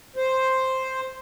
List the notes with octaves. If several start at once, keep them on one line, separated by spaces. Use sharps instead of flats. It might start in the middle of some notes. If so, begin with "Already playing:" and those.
C5